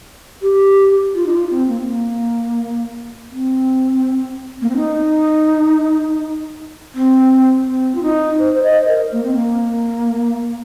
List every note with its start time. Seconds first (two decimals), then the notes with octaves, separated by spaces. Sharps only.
0.42 G4
1.15 F4
1.26 D#4
1.32 F4
1.50 C4
1.68 A#3
1.80 C4
1.86 A#3
3.32 C4
4.61 A#3
4.69 C4
4.76 D#4
6.95 C4
7.67 C4
7.95 F4
8.02 D#4
8.39 C5
8.54 C5
8.63 D#5
8.81 C5
8.88 A#4
9.12 A#3
9.23 C4
9.35 A#3